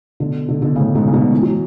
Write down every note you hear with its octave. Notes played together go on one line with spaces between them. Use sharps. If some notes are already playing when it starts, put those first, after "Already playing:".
B2 D3
B2 D3
B2 D3
A2 C#3
G#2 B2
C#3
B2 D3
E3
F#3